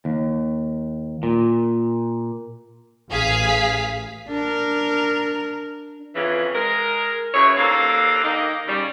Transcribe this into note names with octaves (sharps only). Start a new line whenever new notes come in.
D#2
A#2
A1 G#4 F5 B6
D4 A#4
F2 C#3 E3
G#3 A#4
F#2 C#3 E3 E4 G#4 C#5
D#2 A#3 C4 D4 A4 F5
D#3 A#3 D#4
C#3 G3